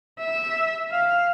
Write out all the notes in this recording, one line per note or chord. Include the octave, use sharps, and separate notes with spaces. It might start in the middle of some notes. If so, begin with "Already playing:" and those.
E5
F5